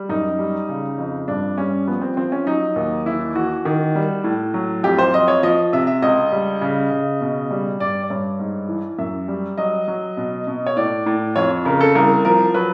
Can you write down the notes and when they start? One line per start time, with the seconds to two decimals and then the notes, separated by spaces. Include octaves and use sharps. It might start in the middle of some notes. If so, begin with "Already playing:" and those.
Already playing: G3
0.09 F#2 D#4
0.39 G3
0.69 C#3
0.98 F2
1.28 G2 D4
1.58 G3 C#4
1.87 F3 B3
2.02 C4
2.17 F3 C4
2.32 C#4
2.46 F#3 D#4
2.76 D#2
3.06 E3 E4
3.35 E3 F#4
3.65 D#3
3.95 G3
4.24 A2
4.54 F#3
4.83 F2 G4
4.98 C5
5.13 F2 D#5
5.28 C#5
5.43 F3 D#5
5.73 C3 E5
5.87 E5
6.02 C#2 D#5
6.32 G3
6.61 C#3
6.91 C#3
7.21 B2
7.51 G3
7.80 G2 D5
8.03 D5
8.10 G2 C#5
8.39 G#2
8.68 E3
8.98 F#2 E5
9.28 G3
9.58 F#3 D#5
9.88 F#3
10.17 B2
10.47 B2
10.66 C#5
10.77 A2 D5
11.06 A2
11.36 F2 C#5
11.65 C#3 A#4
11.81 A4
11.95 C2 A#4
12.25 F3 A#4
12.54 F#3 B4